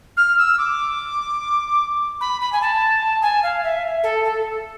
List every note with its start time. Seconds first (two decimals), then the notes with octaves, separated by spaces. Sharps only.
0.17 F6
0.38 E6
0.58 D6
2.21 B5
2.41 B5
2.52 G#5
2.61 A5
3.22 G#5
3.43 F5
3.64 E5
4.03 A4
4.25 A4